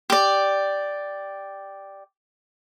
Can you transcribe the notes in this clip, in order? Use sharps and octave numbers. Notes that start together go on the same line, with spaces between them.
G4 D5